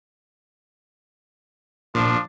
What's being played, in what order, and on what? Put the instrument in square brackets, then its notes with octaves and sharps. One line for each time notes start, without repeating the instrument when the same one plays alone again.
[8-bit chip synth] A#2 [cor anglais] F3 [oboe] D4